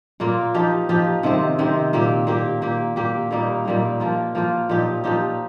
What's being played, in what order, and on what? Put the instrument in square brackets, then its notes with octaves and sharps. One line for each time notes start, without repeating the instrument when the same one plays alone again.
[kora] A#2 A#3 F4
F3 D#4 G4
F3 D#4 G4
C3 D#3 C4
C3 D#3 C4
A#2 A#3 G4
A#2 A#3 G4
A#2 A#3 G4
A#2 A#3 G4
A#2 G3 A#3 D#4
A#2 G3 A#3 D#4
F3 A#3 F4
F3 A#3 F4
A#2 F3 D#4 G4
A#2 F3 D#4 G4